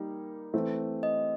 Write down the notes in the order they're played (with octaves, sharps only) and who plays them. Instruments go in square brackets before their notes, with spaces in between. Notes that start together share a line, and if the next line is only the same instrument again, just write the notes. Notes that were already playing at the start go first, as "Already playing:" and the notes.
Already playing: [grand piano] G3 A#3 D#4 G4
E3 A3 C4
[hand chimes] D#5